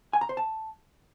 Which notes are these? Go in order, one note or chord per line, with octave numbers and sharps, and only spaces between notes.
G#5
A#5
C5
A5